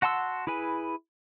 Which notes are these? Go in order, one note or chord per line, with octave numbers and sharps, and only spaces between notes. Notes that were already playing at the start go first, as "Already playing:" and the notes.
F#4 F#5 A5 C6 E6
E4 G#4 B4 G#5